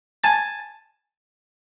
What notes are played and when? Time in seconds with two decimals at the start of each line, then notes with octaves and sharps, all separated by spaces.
0.23 G#5 A5 A6